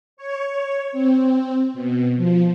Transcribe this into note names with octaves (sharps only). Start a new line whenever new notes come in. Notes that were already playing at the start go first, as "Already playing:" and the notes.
C#5
C4
B2
F3